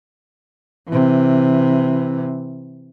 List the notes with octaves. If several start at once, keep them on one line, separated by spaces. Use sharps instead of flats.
C3 E3